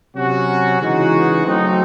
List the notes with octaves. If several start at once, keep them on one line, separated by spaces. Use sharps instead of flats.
C3 F#3 C#4 F#4
C#3 E3 G#3 D#4 F#4
F#3 A3 C4 D#4